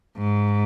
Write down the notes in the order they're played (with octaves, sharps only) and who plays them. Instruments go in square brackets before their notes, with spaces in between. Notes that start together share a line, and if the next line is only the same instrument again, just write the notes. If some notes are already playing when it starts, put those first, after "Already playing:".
[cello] G#2